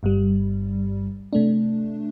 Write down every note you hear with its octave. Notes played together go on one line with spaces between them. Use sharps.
G1 G2 G3
C3 A3 D4